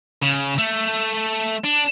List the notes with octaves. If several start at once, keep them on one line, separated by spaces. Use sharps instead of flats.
C#3
A3
D4